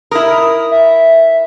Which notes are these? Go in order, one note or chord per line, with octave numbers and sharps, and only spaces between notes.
E4 A#4 D#6
E5